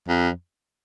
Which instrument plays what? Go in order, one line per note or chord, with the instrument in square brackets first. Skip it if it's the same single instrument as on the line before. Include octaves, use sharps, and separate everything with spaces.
[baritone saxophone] F2